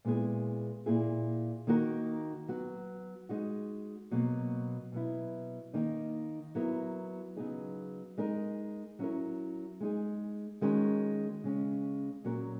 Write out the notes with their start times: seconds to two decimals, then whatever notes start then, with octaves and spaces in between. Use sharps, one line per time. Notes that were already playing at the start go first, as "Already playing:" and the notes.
0.05 A#2 G#3 B3 E4 G#4
0.86 A#2 A#3 E4 G#4
1.67 D#3 A#3 D#4 F#4 A#4
2.48 F#3 B3 F#4
3.29 G#3 D#4 F#4
4.11 B2 F#3 A#3
4.92 B2 F#3 B3 E4
5.74 D#3 A#3 D#4
6.55 F#3 B3 E4 A#4
7.36 C#3 F#3 B3 D#4 G#4
8.18 G#3 D#4 A#4
8.99 F#3 C#4 E4 A#4
9.80 G#3 D#4 G#4
10.61 D#3 G#3 C#4 F#4 A#4
11.43 C#3 G#3 C#4
12.24 A#2 F#3 C#4 F#4 A#4